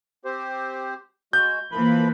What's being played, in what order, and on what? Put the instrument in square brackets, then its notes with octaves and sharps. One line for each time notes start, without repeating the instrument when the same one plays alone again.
[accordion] C4 G4 C5
[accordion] G#3 F#4 [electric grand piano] G6
[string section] E3 A#3 [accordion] F3 B4 B5